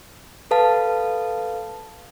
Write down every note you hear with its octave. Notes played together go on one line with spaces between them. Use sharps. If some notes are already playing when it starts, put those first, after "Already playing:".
A4 B4 F5 A5